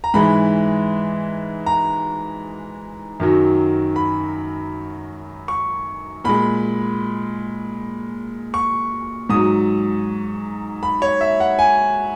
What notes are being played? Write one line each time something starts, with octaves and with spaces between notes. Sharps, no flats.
A#5
G#2 E3 G#3 B5
A#5
F#2 D#3 F#3
B5
C#6
A#2 G#3 B5
C#6
G#2 F#3 D#6
B5
C#5
E5
F#5
G#5